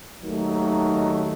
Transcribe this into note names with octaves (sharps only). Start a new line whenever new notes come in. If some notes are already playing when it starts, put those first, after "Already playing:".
D#2 D#3 F#3 A3 D#4